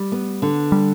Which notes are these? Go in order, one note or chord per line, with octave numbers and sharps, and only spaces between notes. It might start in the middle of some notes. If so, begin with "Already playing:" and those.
Already playing: G3
B3
D3
G3